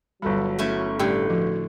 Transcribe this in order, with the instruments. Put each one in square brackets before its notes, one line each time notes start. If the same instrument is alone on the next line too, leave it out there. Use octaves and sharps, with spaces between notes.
[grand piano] G1 A4 B5 [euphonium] F#3 [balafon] G3
[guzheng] A3 C#4 E4
[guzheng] A2 D3 [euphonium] G3 [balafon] G4 G5
[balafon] F3 [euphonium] F#4